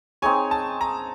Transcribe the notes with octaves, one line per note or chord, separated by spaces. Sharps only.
C4 D#4 G#4 C#5 G#5
A5
A#5